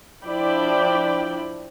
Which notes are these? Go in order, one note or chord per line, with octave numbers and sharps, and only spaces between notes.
F3 D4 E4 D5 G5 B5